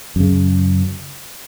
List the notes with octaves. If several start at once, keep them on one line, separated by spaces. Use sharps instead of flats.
F#2 C#3